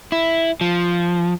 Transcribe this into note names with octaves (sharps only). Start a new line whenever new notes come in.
E4
F3